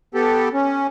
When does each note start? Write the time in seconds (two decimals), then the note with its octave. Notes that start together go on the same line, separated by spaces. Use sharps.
0.14 B3 G4 A4
0.53 C#4